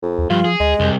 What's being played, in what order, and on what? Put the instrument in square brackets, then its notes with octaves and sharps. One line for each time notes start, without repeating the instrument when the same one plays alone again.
[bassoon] F2
[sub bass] D#2
[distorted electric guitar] G2 [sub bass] F3 [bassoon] F4
[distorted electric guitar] G#4
[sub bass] D2 [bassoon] G#3
[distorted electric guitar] C2 [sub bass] F2